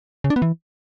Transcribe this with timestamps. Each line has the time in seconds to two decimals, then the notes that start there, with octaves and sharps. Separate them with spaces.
0.24 C#3
0.30 D4
0.36 B3
0.42 E3